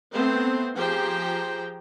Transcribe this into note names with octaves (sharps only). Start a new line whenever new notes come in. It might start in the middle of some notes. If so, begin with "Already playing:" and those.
A3 B3 C4 C5
F3 G4 G#4 C5 G5 A#5